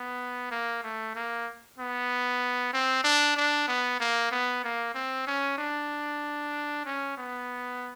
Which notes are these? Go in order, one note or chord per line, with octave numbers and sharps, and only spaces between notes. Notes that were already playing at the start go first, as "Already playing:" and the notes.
Already playing: B3
A#3
A3
A#3
B3
C4
D4
D4
B3
A#3
B3
A#3
C4
C#4
D4
C#4
B3